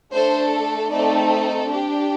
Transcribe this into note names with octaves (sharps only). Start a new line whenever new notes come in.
A3 D4 A4 C5
A3 C4 D#4 A4 D5
D4 G4